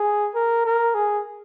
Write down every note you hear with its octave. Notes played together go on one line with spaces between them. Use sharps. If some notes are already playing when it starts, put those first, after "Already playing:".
Already playing: G#4
A#4
A#4
G#4